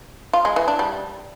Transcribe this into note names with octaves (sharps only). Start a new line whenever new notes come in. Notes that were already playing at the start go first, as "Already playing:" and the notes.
F4
G#3
E3
D4
G3